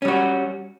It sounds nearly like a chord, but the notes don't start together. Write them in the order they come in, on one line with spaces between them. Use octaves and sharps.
C#4 G3 F#4